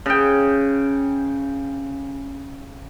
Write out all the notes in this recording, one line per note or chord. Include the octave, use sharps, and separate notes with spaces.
C#3 G5